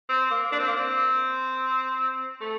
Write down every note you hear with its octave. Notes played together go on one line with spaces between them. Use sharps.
C4
A#3
D4
C4
A#3
C4
A3